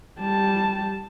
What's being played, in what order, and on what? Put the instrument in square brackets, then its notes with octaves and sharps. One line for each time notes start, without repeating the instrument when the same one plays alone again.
[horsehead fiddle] G3 A5